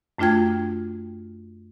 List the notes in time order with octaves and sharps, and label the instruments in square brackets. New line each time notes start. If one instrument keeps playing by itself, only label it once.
[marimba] F#2 A3 D4 F4 G5 G#6